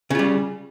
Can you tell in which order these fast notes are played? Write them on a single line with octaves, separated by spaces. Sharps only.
C#3 F4 G3